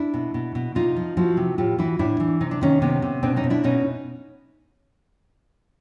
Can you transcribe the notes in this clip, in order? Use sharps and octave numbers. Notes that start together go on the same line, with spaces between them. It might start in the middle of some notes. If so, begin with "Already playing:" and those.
Already playing: D4 E4
B2
B2
B2
C3 D#4 F4
F3
F3 E4 F#4
C3
A2 F4 G4
E3 E4 F#4
A2 D4 E4
E3
C3 D#4
D4
D#3 C#4 D#4
C3 B3 C#4
C3
B2 C4 D4
C#4 D#4
B2
D4 E4
B2 C#4 D#4